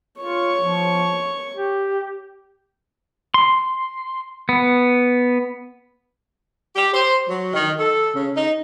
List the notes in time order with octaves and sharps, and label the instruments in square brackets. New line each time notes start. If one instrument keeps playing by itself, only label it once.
[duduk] F4 [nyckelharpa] C#5 C#6
[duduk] F3
G4
[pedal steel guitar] C6
B3
[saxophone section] G4
C5
F#3
D#3
A4
C#3
D#4